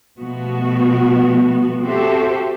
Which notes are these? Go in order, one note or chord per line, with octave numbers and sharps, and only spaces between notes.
B2 F3 G3 A3 B3 F#4
C4 F#4 G4 A4 C5 E5